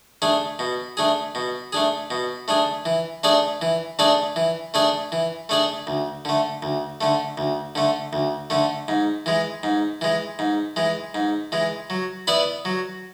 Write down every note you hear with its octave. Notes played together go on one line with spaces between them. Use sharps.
A3 D4 G#4
B2
A3 D4 G#4
B2
A3 D4 G#4
B2
A3 D4 G#4
E3
A3 D4 G#4 D5
E3
A3 D4 G#4 D5
E3
A3 D4 G#4 D5
E3
A3 D4 G#4 D5
D2
D3 A3
D2
D3 A3
D2
D3 A3
D2
D3 A3
G#2
E3 G#3
G#2
E3 G#3
G#2
E3 G#3
G#2
E3 G#3
F#3
B3 E4 B4 D5
F#3